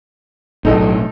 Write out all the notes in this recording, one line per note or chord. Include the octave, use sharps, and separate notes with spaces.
B1 A2 D#4 A4 D#5